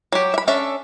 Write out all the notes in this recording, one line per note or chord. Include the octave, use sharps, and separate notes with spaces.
F#3 G4
E5 B5
C#4 D4 A4 E5